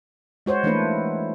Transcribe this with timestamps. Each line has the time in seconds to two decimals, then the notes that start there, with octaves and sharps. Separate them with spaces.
0.46 G#3 F#4 C5 C#5
0.63 E3 A3 A#3 D4 D#4 B4